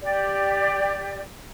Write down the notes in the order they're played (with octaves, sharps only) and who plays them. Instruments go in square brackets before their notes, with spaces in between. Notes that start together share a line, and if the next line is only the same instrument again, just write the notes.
[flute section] G4 D5